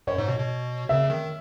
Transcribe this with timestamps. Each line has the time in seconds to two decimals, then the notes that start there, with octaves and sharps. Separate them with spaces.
0.07 F#2 C#5
0.18 G#2
0.28 B2
0.39 B2
0.89 C#3 E5
1.10 D#3